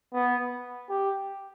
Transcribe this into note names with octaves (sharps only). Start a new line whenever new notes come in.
B3
G4